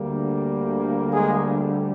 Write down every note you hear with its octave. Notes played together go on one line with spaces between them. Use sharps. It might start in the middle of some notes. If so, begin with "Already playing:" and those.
Already playing: D2 D3 G3 A#3
G#3 G#4